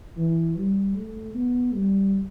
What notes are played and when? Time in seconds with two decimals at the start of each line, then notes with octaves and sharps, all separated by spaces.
0.17 E3
0.56 G3
0.95 A3
1.35 B3
1.74 G3